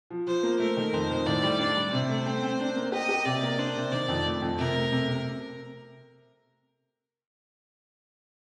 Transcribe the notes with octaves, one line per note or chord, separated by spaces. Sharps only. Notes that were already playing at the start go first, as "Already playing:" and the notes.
F3
F3 C5
A#3
A3 A#4
D#3
F2 C5
D#3
A2 D5
G3
D4 D5
G3
C3 C5
A3
C4
C4
D4
A#3
G4 D#5
G4
C3 D5
A#3
D4 C5
C3
D#3 D5
F2
A3
F2
C3 A#4
A3
C3
C3